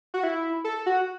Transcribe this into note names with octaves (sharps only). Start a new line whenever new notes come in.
F#4
E4
A4
F#4